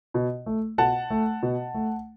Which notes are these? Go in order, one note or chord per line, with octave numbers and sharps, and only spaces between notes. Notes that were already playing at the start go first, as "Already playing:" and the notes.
B2
A3
B2 F#5 A5
A3
B2
A3